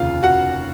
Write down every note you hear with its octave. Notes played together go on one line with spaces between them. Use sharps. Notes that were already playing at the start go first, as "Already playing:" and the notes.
Already playing: F1 D#2 C#3 F4 F5
F#4 F#5